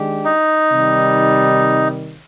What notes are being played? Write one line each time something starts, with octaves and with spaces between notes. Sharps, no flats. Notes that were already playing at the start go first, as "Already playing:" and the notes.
Already playing: D#3 G#3 D4 G4
D#4
C3 D#3 G3